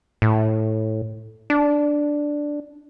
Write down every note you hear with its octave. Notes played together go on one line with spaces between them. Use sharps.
A2
D4